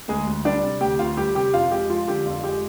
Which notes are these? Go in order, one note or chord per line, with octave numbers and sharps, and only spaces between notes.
D2 G#3 G#4
D2
G3 D4 D5
C3
D2 G4 G5
D2 F4 F5
G3 G4 G5
C3 G4 G5
F2 F4 F5
G#3 G4
F3 F4
D3 G4
F2 F4
G#3 G4